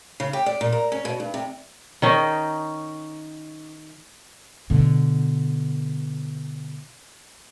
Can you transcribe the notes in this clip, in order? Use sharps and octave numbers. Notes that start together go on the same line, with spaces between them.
C#3
G4
D5
A#2
A#4
C#4
B2
G2
C3
D#3 C#4 D#4
B2 D3